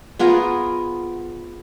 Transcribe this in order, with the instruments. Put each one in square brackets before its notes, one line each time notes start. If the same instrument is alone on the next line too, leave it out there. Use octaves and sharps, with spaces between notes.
[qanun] B3 F4 G#4 A#4